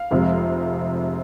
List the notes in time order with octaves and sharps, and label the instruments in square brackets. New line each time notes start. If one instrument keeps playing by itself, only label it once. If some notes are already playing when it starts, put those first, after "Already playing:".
Already playing: [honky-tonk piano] F5
F1 F2 C3 F3 G#3